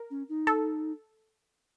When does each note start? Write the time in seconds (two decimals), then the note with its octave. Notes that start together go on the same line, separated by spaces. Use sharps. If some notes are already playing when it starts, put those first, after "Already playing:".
Already playing: A#4
0.10 C#4
0.29 D#4
0.47 A4